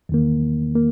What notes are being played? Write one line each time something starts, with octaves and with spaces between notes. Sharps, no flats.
E2 D#3 A#3
A#3